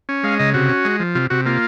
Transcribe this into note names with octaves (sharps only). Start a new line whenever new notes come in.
C#4
G#3 F5
C#3 D#5
C3 F#4
C#4
G#3
F3
C3 F4
C3 F#4
A#3 F4